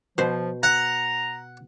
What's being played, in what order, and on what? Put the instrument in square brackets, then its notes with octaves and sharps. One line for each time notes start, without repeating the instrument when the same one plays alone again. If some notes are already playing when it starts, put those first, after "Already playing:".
[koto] B2 C5 [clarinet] F3
[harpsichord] F#5 [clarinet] A#5